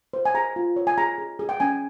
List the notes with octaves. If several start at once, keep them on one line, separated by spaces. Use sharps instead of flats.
C5
G#5
G#4 A#5
F4
C#5
G#5
G#4 A#5
G#4
G#4
G5
C#4 G#5